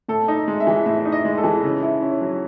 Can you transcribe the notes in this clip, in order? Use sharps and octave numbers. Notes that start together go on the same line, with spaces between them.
A2 A4
D#4
G#3
E5
E3
A2 E5
D#4
D#5
G#3
A4
E3
C#3
E4
C#4
F#3